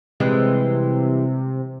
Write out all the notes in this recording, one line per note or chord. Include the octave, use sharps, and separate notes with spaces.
C3 E3 G3 G#3